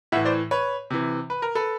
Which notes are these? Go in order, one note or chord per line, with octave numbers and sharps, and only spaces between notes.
A2 E3 E5 F#5
C5 D5
B4 C#5
C3 E3
B4
A#4
A4 B4